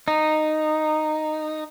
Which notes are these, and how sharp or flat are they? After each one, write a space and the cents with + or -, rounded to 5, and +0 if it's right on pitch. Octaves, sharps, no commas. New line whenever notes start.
D#4 -10